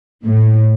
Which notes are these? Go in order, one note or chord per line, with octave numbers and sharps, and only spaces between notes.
A2